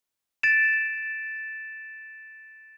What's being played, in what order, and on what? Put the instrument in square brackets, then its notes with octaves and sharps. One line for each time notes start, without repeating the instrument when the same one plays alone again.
[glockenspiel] A6 D7 E7